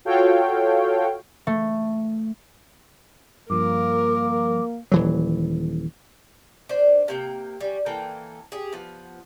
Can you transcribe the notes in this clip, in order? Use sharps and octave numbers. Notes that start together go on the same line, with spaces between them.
F4 F#4 A4 C#5 F5 G5
A3
G2 F3 A#3 A#4 D6
D#1 E3 F#3
D4 C5
C3 A#3 G5
G3 C#4
E3 A#3 A4 G5
G4 G#4
F3 B3